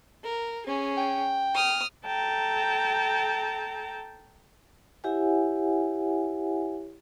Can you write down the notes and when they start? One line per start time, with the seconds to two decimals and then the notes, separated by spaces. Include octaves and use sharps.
0.24 A#4
0.67 C#4 G#4
0.98 G5
1.55 D#6 F6
2.05 A4 G5 A5 A#5
5.04 E4 G4 C#5 E5 F#5 G#5